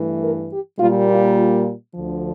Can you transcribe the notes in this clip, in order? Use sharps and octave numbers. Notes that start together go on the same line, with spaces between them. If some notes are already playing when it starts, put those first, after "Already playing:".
Already playing: G2 E3 A3
A#4
G4
A#2 G3 A#3 F4
F4
F4
D2 D3 F3